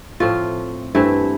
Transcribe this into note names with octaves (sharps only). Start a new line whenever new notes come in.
A2 F3 A3 C4 F4
G2 E3 A3 C4 E4